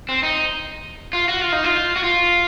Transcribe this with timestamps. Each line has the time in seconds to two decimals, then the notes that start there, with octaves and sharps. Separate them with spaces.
0.09 C4
0.23 D#4
1.13 F4
1.28 F#4
1.41 F4
1.52 D#4
1.64 F4
1.96 F#4
2.04 F4